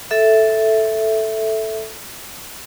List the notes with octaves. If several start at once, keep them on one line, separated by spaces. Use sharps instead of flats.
A4 E5